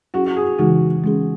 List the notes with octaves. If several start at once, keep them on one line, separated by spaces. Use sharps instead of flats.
F#3 C#4 E4 F#4 G#4
F#4
G#4
C#3 E3 G#3 D#4 F#4 G#4
G#3 C#4 G#4